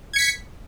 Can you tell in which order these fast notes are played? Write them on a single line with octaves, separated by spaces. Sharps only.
G#6 C#7 B6